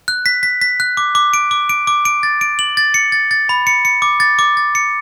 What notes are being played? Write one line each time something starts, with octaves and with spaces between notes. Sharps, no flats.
F#6
B6
B6
B6
F#6
D6
D6
D7
D6
D7
D6
D7
A6
D7
F#7
A6
C#7
A6
A6
B5
C#7
C#7
D6
A6
D6
A6
C#7